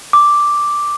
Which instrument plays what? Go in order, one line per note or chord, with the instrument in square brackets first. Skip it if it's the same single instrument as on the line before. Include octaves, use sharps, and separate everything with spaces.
[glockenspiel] D6